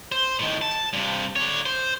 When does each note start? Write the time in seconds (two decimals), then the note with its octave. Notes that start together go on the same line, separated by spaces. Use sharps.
0.12 C5
0.39 A2 D#3
0.62 A5
0.93 G2 C3
1.36 D3 C#5
1.66 C5